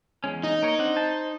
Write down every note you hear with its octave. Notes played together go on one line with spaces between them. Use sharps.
E2 G#3 C#4
D#4
A#3 A#4 C#5
C4 D4 F#5
C5 A5